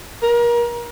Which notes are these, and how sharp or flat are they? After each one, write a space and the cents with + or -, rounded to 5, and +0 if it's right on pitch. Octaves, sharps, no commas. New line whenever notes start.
A#4 +30